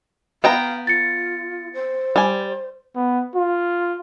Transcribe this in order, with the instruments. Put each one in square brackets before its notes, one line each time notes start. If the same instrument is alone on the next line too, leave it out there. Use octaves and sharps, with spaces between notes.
[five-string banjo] B3 G5 A#5 [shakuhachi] F5
[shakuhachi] F4 [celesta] A6 C#7
[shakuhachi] C5
[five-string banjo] G3 G#5
[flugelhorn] B3
F4